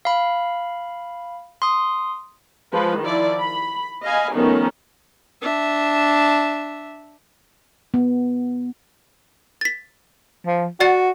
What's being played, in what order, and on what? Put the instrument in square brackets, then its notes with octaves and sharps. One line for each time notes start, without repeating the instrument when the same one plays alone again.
[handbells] F5 B5
C6 D#6
[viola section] F3 G#3 B4
D#3 F3 E4 D5
B5
D#5 F5 G#5 B5
D#3 F3 A3 B3 C#4 D#4
[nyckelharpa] D4 E5
[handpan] B3
[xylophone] A6 B6
[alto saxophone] F3
[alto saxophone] F#4 [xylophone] D5 F#5 A6